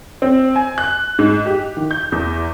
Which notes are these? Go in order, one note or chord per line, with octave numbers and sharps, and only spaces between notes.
C4
G#5
F#6
G#2
G4
D#3
G6
E2